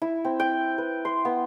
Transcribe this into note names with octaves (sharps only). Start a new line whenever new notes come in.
E4
C4
G5
B4
C6
B3